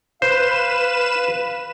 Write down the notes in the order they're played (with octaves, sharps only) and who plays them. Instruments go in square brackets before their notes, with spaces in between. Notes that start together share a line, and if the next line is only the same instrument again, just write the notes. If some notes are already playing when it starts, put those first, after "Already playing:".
[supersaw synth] B4 E7 [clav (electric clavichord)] C5 [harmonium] F5